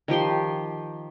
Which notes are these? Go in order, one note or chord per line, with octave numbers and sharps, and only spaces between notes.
D#3 F3 G4 C6